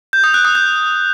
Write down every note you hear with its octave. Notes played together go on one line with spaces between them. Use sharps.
G6
D#6
F#6
D#6
G6